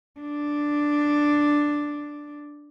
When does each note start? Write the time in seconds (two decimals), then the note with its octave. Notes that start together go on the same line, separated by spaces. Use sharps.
0.20 D4